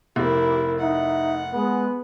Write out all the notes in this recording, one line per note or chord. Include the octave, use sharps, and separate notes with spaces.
F1 E4 G4 A#4
D#4 E5 F#5
G#3 B3